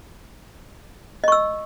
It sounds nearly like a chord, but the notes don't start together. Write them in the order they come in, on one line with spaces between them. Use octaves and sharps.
D#5 C#6 E6